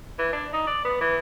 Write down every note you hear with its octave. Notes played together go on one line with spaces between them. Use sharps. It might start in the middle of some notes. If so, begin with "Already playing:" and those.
E3
D4
D#4
D5
B3
E3